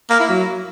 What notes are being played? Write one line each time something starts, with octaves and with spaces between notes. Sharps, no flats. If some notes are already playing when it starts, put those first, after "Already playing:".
A#3
E4
F#3